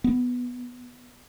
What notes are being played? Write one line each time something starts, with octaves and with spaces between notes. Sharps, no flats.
B3